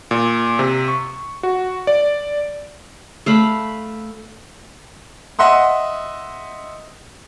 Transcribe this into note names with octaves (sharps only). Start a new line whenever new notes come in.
A#2
C3
C#6
F#4
D5
A3 F5 B5
D#5 E5 F#5 C6 D#6